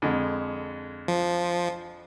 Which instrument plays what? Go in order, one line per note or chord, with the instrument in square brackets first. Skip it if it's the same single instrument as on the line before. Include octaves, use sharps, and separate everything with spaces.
[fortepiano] F2 D3 G#3
[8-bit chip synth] F3